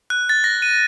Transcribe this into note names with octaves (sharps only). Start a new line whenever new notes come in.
F#6
A6
A#6
D#7